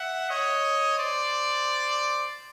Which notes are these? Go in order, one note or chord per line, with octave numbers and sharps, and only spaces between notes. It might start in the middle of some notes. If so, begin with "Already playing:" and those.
Already playing: E5 F#5
C#5 D#5
C5 D5